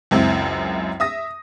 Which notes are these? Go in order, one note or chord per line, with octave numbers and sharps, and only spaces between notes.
C#2 F#2 C4 E4
E5 D#6 A#6